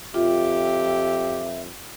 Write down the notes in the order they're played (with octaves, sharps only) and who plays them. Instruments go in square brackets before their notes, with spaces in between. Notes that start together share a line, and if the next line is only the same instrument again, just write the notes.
[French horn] F2 [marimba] F4 [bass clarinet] G4 [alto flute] E5